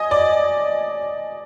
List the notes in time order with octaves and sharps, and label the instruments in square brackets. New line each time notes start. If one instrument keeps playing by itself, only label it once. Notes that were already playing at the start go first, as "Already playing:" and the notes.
Already playing: [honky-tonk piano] D#5 G#5
D5